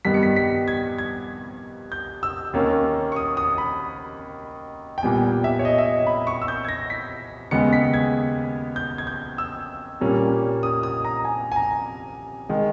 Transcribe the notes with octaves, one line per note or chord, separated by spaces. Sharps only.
G2 D#3 G3 B3 B6
C#7
B6
B6
G#6
G#6
G6
E6
D#2 D#3 A#3 C#4
C#6
D#6
D#6
B5
G5
A#2 G3 B3 G#5
G5
E5
C#5
D#5
E5
D#5
B5
C#6
E6
G6
G#6
A#6
B6
D#2 C#3 G#3 B3 C#7
B6
G#6
G6
G#6
G6
E6
A#2 G3 A#3 C#4
D#6
D#6
A#5
G#5
G#5
A#5
D#3 G#3